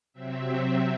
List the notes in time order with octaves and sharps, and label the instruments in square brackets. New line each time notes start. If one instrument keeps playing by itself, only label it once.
[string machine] C3 F#3 C4 E5